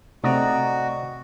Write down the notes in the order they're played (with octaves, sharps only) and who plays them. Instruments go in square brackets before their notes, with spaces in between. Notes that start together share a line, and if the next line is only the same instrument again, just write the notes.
[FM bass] C3 [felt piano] A3 C4 [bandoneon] F#4 [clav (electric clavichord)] D5 D#5 A#5